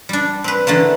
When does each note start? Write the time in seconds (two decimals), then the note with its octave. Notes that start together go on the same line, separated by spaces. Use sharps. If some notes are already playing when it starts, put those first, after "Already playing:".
0.09 G3 D4
0.44 C4 B4
0.67 D3 E3 A3 A#3